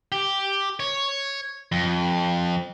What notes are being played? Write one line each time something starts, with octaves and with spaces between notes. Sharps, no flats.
G4
C#5
F2